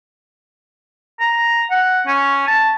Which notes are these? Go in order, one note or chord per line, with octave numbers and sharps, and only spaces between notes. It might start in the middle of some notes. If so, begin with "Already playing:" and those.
A#5
F#5
C#4
A5